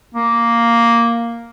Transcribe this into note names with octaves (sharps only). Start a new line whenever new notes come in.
A#3